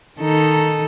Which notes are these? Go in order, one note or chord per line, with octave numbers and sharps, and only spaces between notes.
D#3 D#4 A4